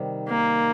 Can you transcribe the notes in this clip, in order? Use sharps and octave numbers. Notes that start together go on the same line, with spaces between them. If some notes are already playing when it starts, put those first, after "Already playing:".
Already playing: C3 D#3 G3
A#3